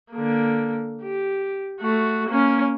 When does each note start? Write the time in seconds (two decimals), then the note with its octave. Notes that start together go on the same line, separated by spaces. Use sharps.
0.13 D3 A#3
1.02 G4
1.80 A3 F#4
2.29 A#3 C#4